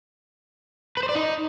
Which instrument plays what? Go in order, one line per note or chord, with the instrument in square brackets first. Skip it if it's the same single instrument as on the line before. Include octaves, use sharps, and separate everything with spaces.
[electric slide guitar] B4
C5
D5
D#4